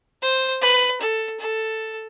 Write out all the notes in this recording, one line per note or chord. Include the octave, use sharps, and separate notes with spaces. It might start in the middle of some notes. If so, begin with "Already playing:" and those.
C5
B4
A4
A4